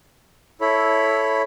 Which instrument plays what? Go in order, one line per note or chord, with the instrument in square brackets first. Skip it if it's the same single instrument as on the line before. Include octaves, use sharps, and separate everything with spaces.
[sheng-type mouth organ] E4 A4 C#5 B5